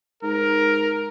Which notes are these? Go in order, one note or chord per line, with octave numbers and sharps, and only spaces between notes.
G#2 A#4